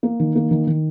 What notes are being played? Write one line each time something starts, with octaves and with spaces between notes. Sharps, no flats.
A#3
D#3
A#3
D#3
D#3